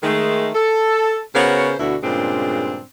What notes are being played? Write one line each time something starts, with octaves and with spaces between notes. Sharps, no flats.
D#3 G#3 A3
A4
C#3 B3 F#4 A#4 C5 C#5
D2 B2 D3 E4 F#4
G2 A#2 C#3 G#3 C4 D4